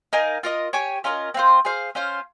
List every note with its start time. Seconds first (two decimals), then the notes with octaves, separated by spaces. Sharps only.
0.13 D#4 A#4 F5 G#5
0.43 F4 A#4 D#5
0.73 G4 C#5 G#5
1.04 C#4 F4 A#4 D#5
1.34 C4 F4 C5
1.65 G#4 C5 F5
1.95 C#4 F4 C5 F5